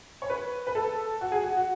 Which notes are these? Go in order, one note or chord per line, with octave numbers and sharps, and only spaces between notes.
C#5
B4
B4
A4
F#4
G#4
F#4
F#4